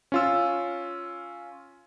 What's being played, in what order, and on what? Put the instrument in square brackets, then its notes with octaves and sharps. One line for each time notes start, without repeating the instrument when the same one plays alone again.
[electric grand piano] C#4 F4 E6